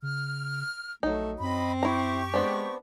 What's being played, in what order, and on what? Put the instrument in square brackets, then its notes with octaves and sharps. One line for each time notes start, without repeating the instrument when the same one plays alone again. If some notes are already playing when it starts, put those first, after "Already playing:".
[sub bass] C#3 [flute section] F6
[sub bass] A#1 [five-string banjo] F#3 D#4 [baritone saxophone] A3
[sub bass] F#2 [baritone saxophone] C4 [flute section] D#5 B5
[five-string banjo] E4 A#5 [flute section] G4 C#6
[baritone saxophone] G#3 [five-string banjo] B3 C4 D4